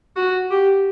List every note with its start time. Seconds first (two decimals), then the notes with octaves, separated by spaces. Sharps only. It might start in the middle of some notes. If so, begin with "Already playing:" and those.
0.16 F#4
0.51 G4